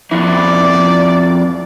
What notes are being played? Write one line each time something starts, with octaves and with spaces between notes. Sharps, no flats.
F2 E4 D5